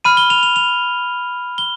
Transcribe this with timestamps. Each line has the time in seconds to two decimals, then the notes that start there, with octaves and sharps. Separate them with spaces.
0.05 B5 F6 D#7
0.17 G7
0.30 F7
0.43 F7
0.56 F7
1.58 G7